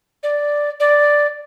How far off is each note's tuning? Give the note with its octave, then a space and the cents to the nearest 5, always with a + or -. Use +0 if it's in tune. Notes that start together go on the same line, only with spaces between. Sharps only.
D5 +0
D5 +0